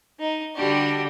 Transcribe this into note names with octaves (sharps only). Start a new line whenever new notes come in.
D#4
D3 G3 D4 F#4 G4